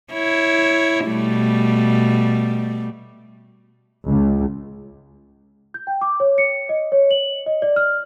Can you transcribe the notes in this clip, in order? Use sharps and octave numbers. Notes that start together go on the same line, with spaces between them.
E4 C#5
B2 G3 A3
C#2
G6
G5
D6
C#5
C#7
D#5
C#5
F#7
D#5
D5
F6